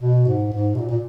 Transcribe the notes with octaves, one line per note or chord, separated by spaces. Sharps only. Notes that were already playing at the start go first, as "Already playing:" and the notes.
B2
G#2
G#2
B2
A#2
A#2